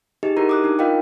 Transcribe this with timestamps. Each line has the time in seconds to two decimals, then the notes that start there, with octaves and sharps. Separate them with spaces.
0.23 D#4 G4 G#4 D#5
0.37 D#4 E4 F#4 G4 A#4 A#5
0.49 D6 D#6 F#6
0.64 D4 D#4
0.79 F4 A#4 D#5 F5 G5